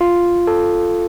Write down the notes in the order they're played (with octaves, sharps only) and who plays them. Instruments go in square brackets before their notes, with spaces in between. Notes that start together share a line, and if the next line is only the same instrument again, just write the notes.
[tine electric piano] F4
A4